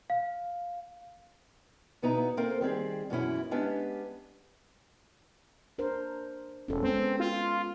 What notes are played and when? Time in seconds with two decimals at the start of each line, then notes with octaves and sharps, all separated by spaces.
0.10 F5
2.02 D2 B2 B3 D#4 E4 A#5
2.37 A#3 C4 A4 A#4 C5
2.61 D#3 G3 C4 G#4
3.10 F#2 B2 E3 C#4 E4
3.51 G#3 B3 C#4 D4 G4
5.78 D4 A#4 C5
6.68 E1 C#4 A4
6.83 G#3 B3 C4
7.20 F4